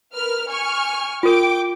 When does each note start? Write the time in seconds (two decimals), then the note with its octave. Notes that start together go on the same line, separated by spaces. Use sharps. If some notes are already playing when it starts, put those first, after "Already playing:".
0.15 A#4 B4 F6
0.48 G#5 C#6 F6
1.23 F4 A#4 G5 D6